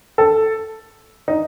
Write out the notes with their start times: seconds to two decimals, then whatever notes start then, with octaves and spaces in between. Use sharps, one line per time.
0.18 A4
1.28 D#4